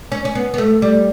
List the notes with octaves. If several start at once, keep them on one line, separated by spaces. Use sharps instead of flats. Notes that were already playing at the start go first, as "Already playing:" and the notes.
C#4
C#4
B3
B3
A3
G3